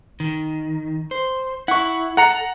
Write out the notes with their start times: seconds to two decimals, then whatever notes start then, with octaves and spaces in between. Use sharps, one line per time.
0.20 D#3
1.11 C5
1.68 E4 F#5 C#6
2.17 A4 F#5 A#5 C#7